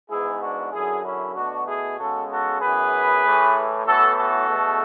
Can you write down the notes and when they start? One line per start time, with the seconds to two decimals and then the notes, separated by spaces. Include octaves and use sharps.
0.10 G#2 E3 B3 E4 G#4
0.41 D4 F#4
0.72 F#2 D3 F#3 E4 G#4
1.04 C#4 E4
1.35 B2 A3 D4 F#4
1.66 E4 G#4
1.98 C#3 G#3 B3 F#4 A4
2.29 F#4 A4
2.60 F#2 E3 B3 G#4 B4
3.23 A2 E3 A3
3.85 A2 E3 B3 F#4 A4
4.17 F#4 A4
4.48 E2 B2 A3